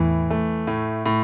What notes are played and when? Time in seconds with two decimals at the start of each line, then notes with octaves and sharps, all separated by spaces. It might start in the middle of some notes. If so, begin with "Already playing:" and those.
Already playing: E2 A2 E3
0.30 A3
0.67 A2
1.06 A2